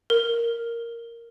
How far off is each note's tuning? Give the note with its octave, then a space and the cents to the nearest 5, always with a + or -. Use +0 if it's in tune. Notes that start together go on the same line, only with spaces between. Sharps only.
A#4 +0